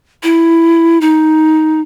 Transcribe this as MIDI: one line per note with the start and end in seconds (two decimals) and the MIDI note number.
0.23 0.98 64
1.01 1.81 63